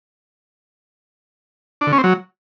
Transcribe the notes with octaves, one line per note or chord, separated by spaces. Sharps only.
D4
D3
C#4
C4
F#3